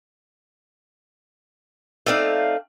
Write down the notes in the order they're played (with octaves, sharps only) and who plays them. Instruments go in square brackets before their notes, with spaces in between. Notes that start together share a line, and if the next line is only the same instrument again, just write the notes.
[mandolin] A3 C4 F5 [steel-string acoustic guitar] D#4 D5 E5